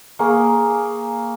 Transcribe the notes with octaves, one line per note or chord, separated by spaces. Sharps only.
A#3 G#4 C#6 D#6